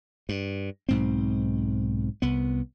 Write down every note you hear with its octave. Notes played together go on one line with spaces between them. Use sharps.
G2
B1 G#2 C4
C2 B3